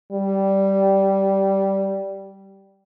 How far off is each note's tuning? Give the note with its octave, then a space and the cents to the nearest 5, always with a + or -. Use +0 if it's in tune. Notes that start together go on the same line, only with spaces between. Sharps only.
G3 -10